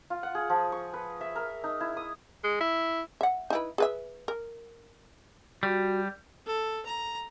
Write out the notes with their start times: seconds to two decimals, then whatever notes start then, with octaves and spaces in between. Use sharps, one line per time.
0.10 F4
0.23 F#5
0.35 G#4
0.50 F3
0.72 C#6
0.94 B4
1.21 E5
1.36 A#4
1.64 D#4
1.81 E4
1.97 D#6
2.44 G#3
2.61 E4
3.21 E5 F#5
3.50 D#4 E4 B4
3.78 G#4 B4 E5
4.28 A#4
5.63 G3 F#4
6.46 A4
6.86 A#5